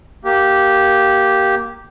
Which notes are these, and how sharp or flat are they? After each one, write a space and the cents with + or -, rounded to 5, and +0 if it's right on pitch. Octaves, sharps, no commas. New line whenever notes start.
A#3 +0 G4 -10